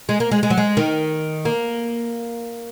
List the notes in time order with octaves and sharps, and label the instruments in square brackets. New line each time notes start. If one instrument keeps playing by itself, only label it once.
[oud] G#3
A#3
G#3
G#3
F#3
G#3
D#3
A#3